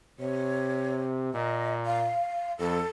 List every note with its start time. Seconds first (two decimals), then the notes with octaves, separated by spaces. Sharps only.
0.19 C3 C#5
1.34 A#2 D#5
1.86 F5
2.59 F2 A4